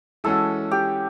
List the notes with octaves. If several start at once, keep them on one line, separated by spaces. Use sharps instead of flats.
E3 G#3 C#4 F#4 A4
G4